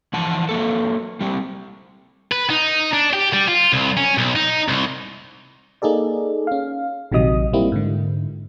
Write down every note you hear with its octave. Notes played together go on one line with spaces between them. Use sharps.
E3 F3 F#5 A5
F#3 A#3 A4
G3 C4 G4
B4
D#4
D4
G4
G3
F4
C2
C#4
B1
D#4
C2
A#3 D#4 G#4 A4 D5
C#4 F5
A#1 C3 D#3 F#3 D#5 D#6
G3 A#3 C4 E4
G#2 D3